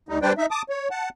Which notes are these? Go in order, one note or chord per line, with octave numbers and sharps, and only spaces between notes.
D2 G3 D#4
G3 D4 B4 C5 D5 G5
D#4 E5
A5 D6 D#6
C#5
F#5 A5